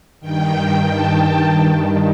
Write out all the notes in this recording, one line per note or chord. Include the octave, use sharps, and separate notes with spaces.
G2 D#3 G5
A5
G2 D#3